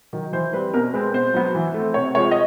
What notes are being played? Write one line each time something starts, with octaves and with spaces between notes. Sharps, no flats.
D#3 F#3
E3 C5
G3 C4 B4
B2 A#4
G#3 C4 B4
B2 C5
F#3 B3
E3
A3 C4
C3 C#5
F3 G#3 C#5
D#5